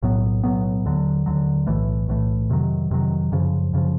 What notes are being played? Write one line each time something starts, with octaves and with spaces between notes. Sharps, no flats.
B1 A2 F#3 B3
B1 A2 F#3 B3
D#2 D3 F#3
D#2 D3 F#3
B1 A2 E3 A3
B1 A2 E3 A3
F2 C3 D#3 F#3
F2 C3 D#3 F#3
F#2 C#3 F3
F#2 C#3 F3